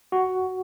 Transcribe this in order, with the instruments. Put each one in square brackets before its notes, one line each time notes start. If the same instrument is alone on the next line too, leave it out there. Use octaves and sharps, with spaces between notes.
[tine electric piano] F#4